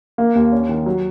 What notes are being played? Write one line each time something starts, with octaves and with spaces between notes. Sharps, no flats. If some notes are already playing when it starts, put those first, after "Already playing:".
A#3
D#2
C#4
D#3
F#3